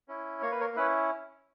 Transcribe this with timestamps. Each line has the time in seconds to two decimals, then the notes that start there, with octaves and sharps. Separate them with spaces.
0.08 C#4 E4
0.42 A#3 C#5
0.51 B4
0.60 A#4 C#5
0.76 C#4 E4 B4